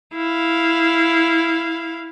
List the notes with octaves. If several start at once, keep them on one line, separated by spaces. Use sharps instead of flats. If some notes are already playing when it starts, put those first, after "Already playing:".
E4 F5